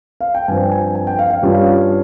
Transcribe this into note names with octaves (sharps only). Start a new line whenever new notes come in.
F5
G5
G2 F3 C4 G#5
G#5
G#5
G5
F5
F5
G2 G3 C#4 F4